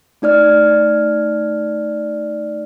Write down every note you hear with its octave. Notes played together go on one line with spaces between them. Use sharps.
A3 D#4 D5 F6